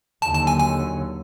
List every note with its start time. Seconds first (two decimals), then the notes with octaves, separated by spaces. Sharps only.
0.22 D#2 D3 F#3 A5
0.34 A5
0.47 G#5
0.60 G#5